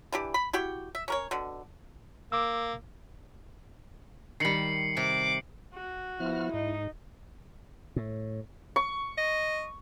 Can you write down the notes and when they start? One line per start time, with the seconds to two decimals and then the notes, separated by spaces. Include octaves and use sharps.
0.12 E3 D4 G4
0.34 B5
0.53 E4 F#4 G4 G5
0.95 E5
1.08 C#4 A#4 C#5
1.31 B2 D3
2.32 A#3 D6 E6
4.40 D#3 G3 C7 C#7 F#7
4.97 C3 D6
5.74 F#4
6.20 F3 B3 E4 F6
6.54 G#2 D#4
7.96 A2
8.76 C#6
9.18 D#5